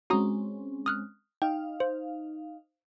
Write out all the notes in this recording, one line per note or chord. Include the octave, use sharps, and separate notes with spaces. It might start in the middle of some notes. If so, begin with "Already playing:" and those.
G#3 C4 C#4 F#4 A#5 D#6
D#6 F6 F#6
D#4 F5 G5
C5